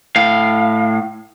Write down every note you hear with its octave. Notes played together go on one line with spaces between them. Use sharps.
A2 F5